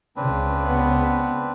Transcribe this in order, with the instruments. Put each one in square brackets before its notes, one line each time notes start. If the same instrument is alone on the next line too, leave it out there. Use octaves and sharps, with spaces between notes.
[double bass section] C#2 C#3 [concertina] C4 D4 B4
[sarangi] B3